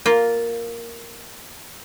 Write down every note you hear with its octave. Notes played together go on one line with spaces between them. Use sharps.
A#3 F4